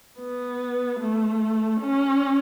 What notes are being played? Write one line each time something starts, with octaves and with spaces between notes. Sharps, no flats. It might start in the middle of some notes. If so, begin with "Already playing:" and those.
B3
A3
C#4